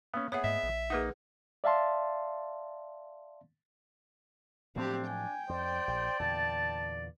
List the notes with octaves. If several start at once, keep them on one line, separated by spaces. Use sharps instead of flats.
A#3 B3 C#4
B3 G#4 C#5 E5 F#5
G#2 A3 D#5 E5
A#1
A#3 D#4 G#4 B4 F#5
D5 E5 F5 A5 C6
A2 F3 F#3 C4 D4 G4
G5 G#5
F2 C5 D5
A#1
E2 A#2 D3 A5